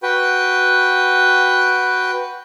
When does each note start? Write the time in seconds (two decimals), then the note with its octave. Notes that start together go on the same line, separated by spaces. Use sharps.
0.03 F#4 B4 G5